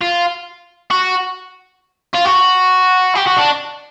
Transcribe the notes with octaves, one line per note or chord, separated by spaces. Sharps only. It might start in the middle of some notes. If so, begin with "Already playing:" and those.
F4
F#4
F4
F#4
G4
F#4
D4